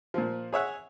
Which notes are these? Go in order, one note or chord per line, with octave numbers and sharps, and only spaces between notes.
A#2 F3
G#4 C#5 E5 F#5